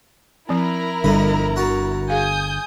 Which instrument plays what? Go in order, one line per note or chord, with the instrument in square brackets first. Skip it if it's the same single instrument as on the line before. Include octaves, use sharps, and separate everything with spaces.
[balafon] F3 C4 [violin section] E4 A#4 A#5
[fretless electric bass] G1 D3 [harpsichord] F2 D#4 B5 [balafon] G3 A4
[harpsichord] F#4 C#5 A5
[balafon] G#4 F5 [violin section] G#5 D#6 G6